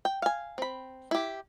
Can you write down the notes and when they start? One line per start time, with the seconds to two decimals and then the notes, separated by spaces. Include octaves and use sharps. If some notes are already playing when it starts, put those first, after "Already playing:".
0.05 G5
0.22 F5 G#5
0.58 C4 B5
1.11 E4 G4